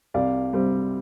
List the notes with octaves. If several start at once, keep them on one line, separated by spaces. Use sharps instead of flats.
C2 D5 F5
C3 G3 C4